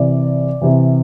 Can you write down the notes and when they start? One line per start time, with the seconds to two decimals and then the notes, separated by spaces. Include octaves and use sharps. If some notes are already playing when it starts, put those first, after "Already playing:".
Already playing: C3 E3 D5
0.62 C3 E3